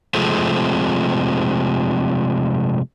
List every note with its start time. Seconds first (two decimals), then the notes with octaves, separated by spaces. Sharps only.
0.14 C3 F3 G#3 A3 C4